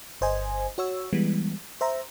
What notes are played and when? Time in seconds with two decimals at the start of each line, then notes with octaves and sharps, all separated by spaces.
0.21 G1 C5 D#5 G#5
0.78 F#4 C#5 E6
1.13 E3 G3 G#3 B3
1.81 C5 E5 A#5